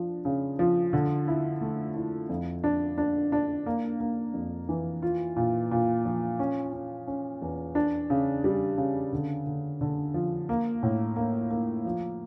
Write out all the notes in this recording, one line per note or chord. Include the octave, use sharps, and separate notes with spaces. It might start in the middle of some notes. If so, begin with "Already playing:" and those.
Already playing: F3 D4
C#3
F3
D3
E4
A3
E4
F2
D4
D4
D4
A#3
A#3
F2
E3
F4
A#2
A#2
F3
C#4
C#4
C#4
E2
D4
C#3
G3
C#3
D3
D3
D3
F3
A#3
A2
A#3
A#3
F3